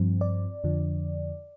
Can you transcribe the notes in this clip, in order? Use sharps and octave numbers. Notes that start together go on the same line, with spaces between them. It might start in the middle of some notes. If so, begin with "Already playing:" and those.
Already playing: G2 F3 C4
D5
F2 D3 F3